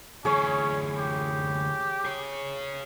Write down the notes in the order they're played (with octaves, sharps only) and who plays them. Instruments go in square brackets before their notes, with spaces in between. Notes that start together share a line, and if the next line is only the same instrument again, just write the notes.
[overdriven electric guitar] D2 E3 [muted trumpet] C#4 [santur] G#4 C#5
[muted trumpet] G4
[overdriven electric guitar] G#4 C#5